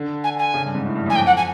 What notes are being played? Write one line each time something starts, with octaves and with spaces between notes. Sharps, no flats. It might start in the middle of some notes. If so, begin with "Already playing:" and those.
Already playing: D3
G#5
G#5
C#3
G2
G#2
A2
G2
F#2 G#5
F2 G5
F#5
G#5